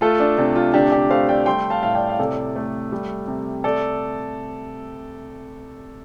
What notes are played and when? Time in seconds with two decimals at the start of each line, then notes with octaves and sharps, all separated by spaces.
0.01 A3 F4 A4
0.20 D4
0.38 C3 D4
0.55 F4
0.74 D3 D4 G4
0.92 D4 G4
1.10 A3 C5 F5
1.29 D5 G5
1.46 G3 G5 C6
1.70 F5 A5
1.83 A2 F5
1.95 D5 G5
2.09 F5
2.19 C3 A4 D5
2.56 A3
2.92 G3
3.27 C3
3.64 A3 A4 D5